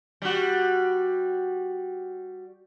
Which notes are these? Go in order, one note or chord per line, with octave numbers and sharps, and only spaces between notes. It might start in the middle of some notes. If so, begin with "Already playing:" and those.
G3 F#4